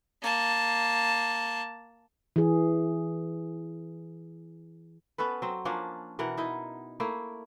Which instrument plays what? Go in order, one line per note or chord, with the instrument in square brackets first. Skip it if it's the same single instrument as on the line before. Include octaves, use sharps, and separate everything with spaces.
[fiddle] A#3 A5
[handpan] E3 G#4
[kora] B3 C#4 A4 B4
F#3 C4
F3 A#3 C#4 D4
B2 E3 A#4 F#5
D#4 E4 D#5
A3 A#3 E4